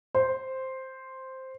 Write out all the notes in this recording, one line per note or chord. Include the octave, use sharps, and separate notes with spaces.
C5